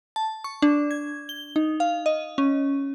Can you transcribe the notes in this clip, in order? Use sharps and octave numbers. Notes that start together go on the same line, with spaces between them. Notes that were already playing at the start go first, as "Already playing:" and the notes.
A5
C#6
D4
G#6
G7
D#4
F5
D#5
C#4